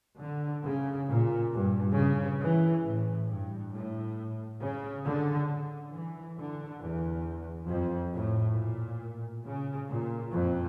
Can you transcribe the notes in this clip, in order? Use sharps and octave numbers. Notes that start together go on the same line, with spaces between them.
D3
C#3
A#2
G2
C#3
E3
A2
G2
A2
C#3
D3
E3
D3
E2
F2
A2
A#2
C#3
A#2
F2